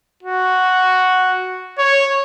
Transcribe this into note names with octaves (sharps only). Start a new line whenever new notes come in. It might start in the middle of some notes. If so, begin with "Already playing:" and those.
F#4
C#5